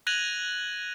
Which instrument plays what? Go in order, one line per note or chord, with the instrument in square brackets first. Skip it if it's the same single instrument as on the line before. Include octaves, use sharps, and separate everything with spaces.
[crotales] F#6 G#6 A#6 D#7 F7 F#7